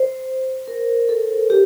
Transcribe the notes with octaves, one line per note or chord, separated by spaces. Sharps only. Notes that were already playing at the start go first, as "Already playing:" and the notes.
Already playing: C5
A#4
A4
G4